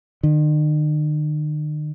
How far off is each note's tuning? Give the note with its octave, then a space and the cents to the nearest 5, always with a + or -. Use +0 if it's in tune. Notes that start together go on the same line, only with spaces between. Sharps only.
D#3 -45